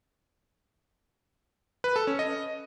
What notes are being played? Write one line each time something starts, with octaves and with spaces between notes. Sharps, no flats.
B4
A4
C#4
D#5